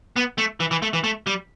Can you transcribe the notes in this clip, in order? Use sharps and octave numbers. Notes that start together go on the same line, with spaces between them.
B3
A3
E3
E3
A3
E3
A3
G3